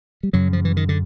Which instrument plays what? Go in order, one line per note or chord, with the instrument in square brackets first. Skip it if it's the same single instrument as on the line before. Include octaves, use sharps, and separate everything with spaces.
[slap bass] G3
F#2 C#3 F#3
F3
E3
D#3
D3